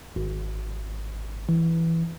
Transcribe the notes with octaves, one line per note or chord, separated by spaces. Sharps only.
G#1
E3